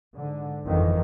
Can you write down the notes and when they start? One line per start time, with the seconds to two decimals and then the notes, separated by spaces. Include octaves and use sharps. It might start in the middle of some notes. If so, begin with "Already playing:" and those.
0.15 G#2 D3
0.65 G1 F2 D#3 E3